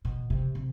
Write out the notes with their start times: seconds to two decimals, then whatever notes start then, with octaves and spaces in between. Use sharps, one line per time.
0.05 B2
0.30 C3
0.55 C3